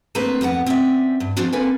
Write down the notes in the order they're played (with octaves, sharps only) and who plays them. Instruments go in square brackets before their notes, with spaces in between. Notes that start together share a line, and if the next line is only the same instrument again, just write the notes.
[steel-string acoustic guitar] A3 A#3 C4 D4 B4
F2 B3 A4 F#5
C4 C#4 E4 D5 E5
G2
F3 G#3 B3 C4 D4 F#4
A#3 C4 C#4 A4 B4 G#5